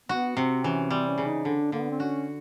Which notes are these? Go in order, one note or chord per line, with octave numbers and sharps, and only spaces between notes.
B3 F#4
C3 C4
E3 C#4
G3 C4
C#4
C#3
D#4
D3 D4
D3 A#3
B3
C4
C#4 F#4